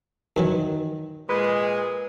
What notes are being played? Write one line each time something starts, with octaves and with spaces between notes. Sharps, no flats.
F#2 D#3 E3 F#3
A#2 G#3 B4